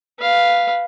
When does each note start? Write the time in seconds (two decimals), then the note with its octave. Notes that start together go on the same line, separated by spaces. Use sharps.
0.19 B4 F5